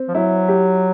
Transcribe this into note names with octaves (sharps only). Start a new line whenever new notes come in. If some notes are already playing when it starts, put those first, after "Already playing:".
Already playing: C4
F3
F#3 E4
G4